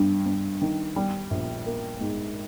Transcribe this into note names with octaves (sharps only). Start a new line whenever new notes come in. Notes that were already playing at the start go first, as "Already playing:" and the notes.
Already playing: G2
G2
D#3
G3
A#1
A#3
G#2